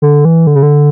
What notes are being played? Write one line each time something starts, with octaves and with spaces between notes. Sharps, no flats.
D3
E3
D3
C#3
D3